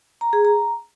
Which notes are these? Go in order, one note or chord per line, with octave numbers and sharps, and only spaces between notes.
A#5
G#4
A#5